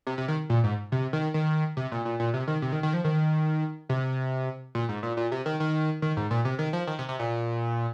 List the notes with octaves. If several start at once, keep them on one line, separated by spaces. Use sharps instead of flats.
C3
C3
D#3
A#2
G#2
C3
D#3
D#3
C3
A#2
A#2
A#2
C3
D#3
C3
D#3
D#3
F3
D#3
C3
A#2
G#2
A#2
A#2
C3
D#3
D#3
D#3
G#2
A#2
C3
D#3
F3
D#3
C3
C3
A#2